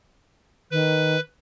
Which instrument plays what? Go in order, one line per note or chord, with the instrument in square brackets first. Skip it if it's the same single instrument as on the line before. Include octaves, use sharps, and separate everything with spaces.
[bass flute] D#3 [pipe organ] B4